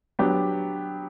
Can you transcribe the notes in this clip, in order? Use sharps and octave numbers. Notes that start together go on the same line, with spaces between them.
F#3 B3 D4 G4